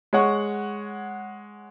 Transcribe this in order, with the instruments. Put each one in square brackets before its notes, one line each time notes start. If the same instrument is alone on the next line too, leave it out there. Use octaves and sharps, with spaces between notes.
[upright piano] G#3 C#5 F#5 C#6